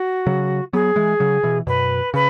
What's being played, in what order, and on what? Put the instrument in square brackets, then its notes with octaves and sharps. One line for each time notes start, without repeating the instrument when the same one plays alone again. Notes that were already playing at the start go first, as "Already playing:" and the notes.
Already playing: [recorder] F#4
[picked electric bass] C#3 F#3
[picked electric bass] F#3 B3 [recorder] G#4
[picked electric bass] E3 G#3
C#3 F#3
B2 E3
[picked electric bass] F#2 B2 [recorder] B4
[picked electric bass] C#3 [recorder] B4